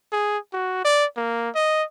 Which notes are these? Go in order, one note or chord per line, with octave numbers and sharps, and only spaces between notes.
G#4
F#4
D5
A#3
D#5